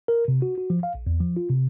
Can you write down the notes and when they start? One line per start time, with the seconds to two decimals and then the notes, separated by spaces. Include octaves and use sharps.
0.08 A#4
0.28 C3
0.42 F#4
0.58 F#4
0.70 F3
0.83 F5
0.95 A#1
1.07 E2
1.20 F3
1.37 F4
1.50 C3